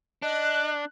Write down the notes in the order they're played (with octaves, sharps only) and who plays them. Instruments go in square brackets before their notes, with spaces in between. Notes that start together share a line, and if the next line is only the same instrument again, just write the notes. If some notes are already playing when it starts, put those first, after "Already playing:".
[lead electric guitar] D4 [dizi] D#5 [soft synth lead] F#6